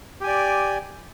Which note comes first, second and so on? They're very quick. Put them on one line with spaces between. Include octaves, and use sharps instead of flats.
G4 G#5 D5